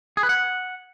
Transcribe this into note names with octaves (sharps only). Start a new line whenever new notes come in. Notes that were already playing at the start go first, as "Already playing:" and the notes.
G#4
B4
F#5